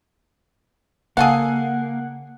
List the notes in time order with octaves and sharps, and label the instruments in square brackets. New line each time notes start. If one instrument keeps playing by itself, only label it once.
[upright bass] C#3 [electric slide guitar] A#3 [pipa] G#4 A4 F5 [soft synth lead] F#5